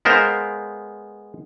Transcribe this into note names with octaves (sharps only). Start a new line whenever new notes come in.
G#3 B3 A#4 C5 F5